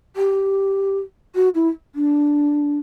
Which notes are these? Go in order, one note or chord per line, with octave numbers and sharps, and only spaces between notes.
G4
F#4
E4
D4